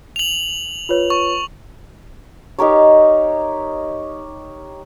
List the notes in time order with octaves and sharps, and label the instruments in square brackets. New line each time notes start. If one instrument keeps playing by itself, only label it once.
[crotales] F7 F#7
[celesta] F4 B4 C#5
[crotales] C#6
[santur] D#4 G4 A#4 C#5